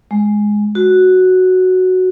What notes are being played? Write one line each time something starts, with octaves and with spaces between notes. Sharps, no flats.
G#3
F#4